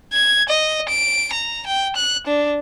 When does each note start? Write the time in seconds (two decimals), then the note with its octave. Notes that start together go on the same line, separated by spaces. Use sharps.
0.13 G#6
0.49 D#5
0.89 D7
1.33 A#5
1.67 G5
1.96 F#6
2.27 D4